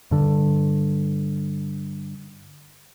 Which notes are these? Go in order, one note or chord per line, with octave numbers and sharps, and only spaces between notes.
G2 D3